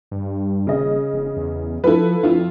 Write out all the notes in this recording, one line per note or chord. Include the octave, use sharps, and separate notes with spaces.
G2
D#1 C#3 D#5
E1
E2
F3 E4 A4 B4
F2 E4 F4